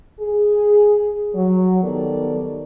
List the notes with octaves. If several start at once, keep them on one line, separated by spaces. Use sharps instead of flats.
G#4
F#3
D#3 G3 B3 A4 A#4 D5